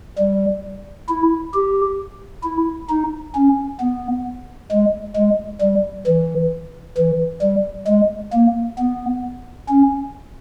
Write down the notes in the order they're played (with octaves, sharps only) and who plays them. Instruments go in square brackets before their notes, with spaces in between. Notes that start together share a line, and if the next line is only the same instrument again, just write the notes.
[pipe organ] G3
E4
G4
E4
D#4
C#4
B3
G#3
G#3
G3
E3
E3
G3
G#3
A#3
B3
C#4